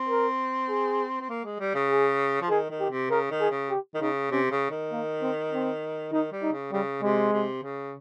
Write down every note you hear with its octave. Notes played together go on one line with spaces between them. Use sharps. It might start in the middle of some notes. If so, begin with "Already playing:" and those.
Already playing: C4
A#4
G#4
C4
A#3
G#3
G3
C#3
G#4
F3
D#3 G#4
D#3
G4
C3
C#3 A#4
D#3
G#4
C#3
G4
D#3
C#3 D#4
C3 C#4
C#3
D#3
A#3
C4
C4
D#3 D#4
G3
D#4
C#3
C#3 G3
C3 G#3
C3
C#3